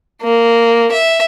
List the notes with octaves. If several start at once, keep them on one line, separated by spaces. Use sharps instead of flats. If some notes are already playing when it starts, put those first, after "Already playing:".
A#3
E5